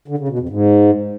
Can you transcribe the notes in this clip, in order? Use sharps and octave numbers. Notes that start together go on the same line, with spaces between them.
D3
C#3
B2
F2
G#2